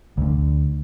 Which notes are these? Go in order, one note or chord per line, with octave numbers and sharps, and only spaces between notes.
D2 D3